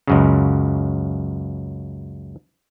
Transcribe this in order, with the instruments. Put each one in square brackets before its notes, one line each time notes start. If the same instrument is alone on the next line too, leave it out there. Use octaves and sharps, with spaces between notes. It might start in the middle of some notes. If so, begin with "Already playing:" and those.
[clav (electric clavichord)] C#2 F#2 C#3